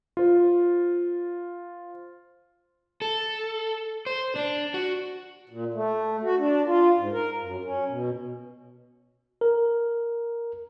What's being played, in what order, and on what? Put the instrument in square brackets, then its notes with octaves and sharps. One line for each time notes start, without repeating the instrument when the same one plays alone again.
[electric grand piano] F4 C5
[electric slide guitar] A4
C5
D4
F#4
[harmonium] A#2
A3
F#4
D4
F4
G#2
A#4
F#2
C#4
B2
[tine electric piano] A#4